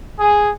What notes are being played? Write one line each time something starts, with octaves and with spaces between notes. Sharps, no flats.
G#4